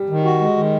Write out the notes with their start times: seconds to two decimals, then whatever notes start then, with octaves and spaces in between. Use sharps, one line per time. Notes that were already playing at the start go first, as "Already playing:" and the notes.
Already playing: G3
0.10 D#3
0.25 F#4
0.41 G#3
0.57 D#3